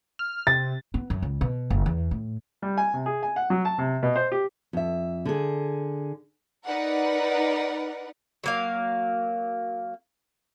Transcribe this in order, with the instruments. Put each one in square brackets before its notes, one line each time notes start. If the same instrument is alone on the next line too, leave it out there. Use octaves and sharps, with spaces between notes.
[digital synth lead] F6
[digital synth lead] C3 [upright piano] A6
[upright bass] B3
F#2
C#2
B2
F#1
E2
A2
[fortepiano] G3
G#5
C3
G#4
G#5
F#5
F#3
A5
C3
B2
C5
G4
[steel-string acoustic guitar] F2 E5
D3 G#4
[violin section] D#4 A#4 B4 D5 F#5
[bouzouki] F#3 A#3 F5